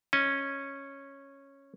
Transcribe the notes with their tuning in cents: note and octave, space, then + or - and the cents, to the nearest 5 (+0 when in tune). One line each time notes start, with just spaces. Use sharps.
C#4 -10 D#5 +0